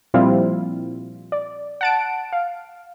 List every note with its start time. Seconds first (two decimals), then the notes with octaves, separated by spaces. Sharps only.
0.14 A#2 F3 G3 C4 E4 F4
1.32 D5
1.81 F#5 A5 D7
2.33 F5